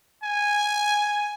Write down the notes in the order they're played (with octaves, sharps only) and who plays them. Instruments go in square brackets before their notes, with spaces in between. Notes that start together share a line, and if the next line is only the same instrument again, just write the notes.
[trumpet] G#5